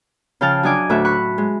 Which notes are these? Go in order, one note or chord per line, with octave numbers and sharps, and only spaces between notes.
C#3 F3 G5 A5 F6
F#3 D4 D#5 G#5 D6
D2 A2 A3 F#4 E5
B5 C#6 F#6
G#3